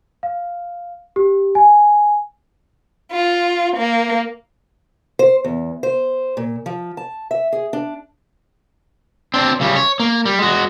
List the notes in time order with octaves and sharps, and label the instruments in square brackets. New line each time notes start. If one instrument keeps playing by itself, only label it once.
[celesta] F5
G4
G#5
[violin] F4
A#3
[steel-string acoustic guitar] C5
E2
C5
A#2
F3
A5
E5
G#4
D4
[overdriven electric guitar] C4 D4
C#3 G3
C#5
A#3
G3
G#3 F#4